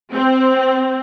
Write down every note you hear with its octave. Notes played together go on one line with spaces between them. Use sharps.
C4